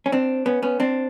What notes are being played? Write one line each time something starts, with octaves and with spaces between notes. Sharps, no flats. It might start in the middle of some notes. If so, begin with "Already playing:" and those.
C#4
C4 D4
B3 C#4
B3 C#4
C4 D4